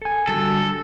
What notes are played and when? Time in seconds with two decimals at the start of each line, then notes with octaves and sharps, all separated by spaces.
0.02 A4 G#5
0.28 D3 G3 F#4 A4